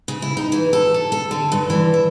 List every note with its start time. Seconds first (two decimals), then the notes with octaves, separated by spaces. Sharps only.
0.08 C#3
0.22 E4
0.37 D#4
0.52 E3
0.73 A4
0.94 A4
1.12 A4
1.31 D3
1.52 G2
1.70 E3
1.94 E5